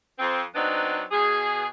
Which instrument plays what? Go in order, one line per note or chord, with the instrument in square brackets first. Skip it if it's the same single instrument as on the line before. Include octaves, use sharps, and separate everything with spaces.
[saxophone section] F2 F3 C4
F#3 B3 C4 D4 D#4
B2 G#4